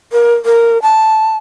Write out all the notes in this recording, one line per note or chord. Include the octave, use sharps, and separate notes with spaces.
A#4
A#4
A5